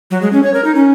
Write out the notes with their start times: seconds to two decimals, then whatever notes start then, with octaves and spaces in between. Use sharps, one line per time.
0.11 F#3
0.22 G#3
0.33 C#4
0.43 C#5
0.54 A#4
0.65 D#4
0.75 C#4